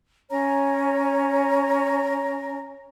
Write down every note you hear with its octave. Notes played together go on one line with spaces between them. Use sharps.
C#4 C#5 A#5